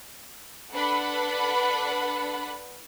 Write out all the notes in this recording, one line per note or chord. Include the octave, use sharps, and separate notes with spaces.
D4 A4 B4 F#5 B5